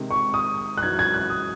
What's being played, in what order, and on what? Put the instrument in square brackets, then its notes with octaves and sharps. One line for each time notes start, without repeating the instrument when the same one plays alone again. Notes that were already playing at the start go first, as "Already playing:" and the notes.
Already playing: [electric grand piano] C3 D#3 G#3 C4 D#4
[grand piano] C#6
D#6
F#6
[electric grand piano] F#2 E3 G#3 D#4 F#4 [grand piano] G#6
[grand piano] G#6
F#6
D#6